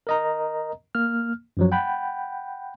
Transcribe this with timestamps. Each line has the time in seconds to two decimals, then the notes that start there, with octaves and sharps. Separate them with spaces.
0.07 A#4 D#5 A#5
0.95 A#3 F6
1.57 F#2 F3 F#3
1.72 F#5 G5 B5